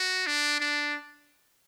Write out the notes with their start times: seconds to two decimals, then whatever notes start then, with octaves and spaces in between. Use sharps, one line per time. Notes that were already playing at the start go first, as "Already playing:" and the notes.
Already playing: F#4
0.27 D4
0.60 D4